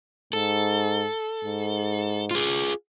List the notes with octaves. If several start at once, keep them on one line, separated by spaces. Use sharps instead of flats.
G#2 A4
G#2
F4 G#4